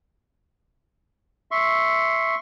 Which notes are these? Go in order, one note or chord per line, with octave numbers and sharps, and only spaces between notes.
E5 C6 C#6